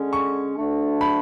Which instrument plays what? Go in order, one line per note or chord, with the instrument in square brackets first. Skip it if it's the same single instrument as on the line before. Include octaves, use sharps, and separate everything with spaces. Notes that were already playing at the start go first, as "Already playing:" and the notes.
Already playing: [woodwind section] D3 G#3 C#4
[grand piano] C#6
[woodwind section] D2 D3 A3 D4
[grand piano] B5